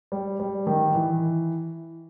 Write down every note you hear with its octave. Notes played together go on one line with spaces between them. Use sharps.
G3
G3
D#3
E3